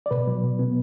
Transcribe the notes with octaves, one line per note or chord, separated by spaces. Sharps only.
D5
B2 B4
F#3
B2
B3